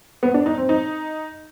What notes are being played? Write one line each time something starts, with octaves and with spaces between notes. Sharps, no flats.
B3
D4
D#4
C4
D#4